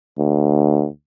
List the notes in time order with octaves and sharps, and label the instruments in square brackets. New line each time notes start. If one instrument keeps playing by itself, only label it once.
[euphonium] D2